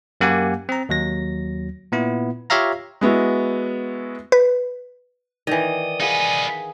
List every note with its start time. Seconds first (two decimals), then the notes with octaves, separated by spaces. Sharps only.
0.21 F#2 A#3 G4 F#5 G#5
0.69 C4 A#5
0.89 D#2 F#3 A#6
1.92 A#2 B3 E4
2.50 F4 G4 C#5 E5 F5 A#5
3.01 G#3 B3 E4 F#4
4.32 B4
5.47 D#3 E3 D5 D#6
6.00 D#4 G#4 B4 F5 F#5